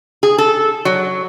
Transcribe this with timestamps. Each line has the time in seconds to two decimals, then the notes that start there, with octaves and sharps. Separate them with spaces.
0.23 G#4
0.38 A4
0.85 F#3